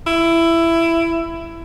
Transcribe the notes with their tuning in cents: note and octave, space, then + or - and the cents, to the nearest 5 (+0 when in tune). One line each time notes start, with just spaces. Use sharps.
E4 +15